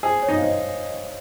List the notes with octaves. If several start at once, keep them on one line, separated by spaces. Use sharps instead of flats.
G#4 C5
C#5
D#4
F5
C5 D#5